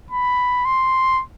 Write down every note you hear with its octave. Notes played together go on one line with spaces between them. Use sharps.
B5
C6